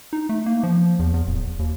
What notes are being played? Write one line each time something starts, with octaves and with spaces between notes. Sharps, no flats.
D#4
A3
A#3
F3
E2
E2
D1
D#2